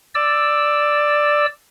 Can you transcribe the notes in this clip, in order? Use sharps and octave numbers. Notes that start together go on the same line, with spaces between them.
D5 E6